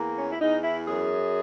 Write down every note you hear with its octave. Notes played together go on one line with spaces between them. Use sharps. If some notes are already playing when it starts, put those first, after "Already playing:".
Already playing: E2 A#3
C#4
E4
E2 D#4
E4
F#2 G#4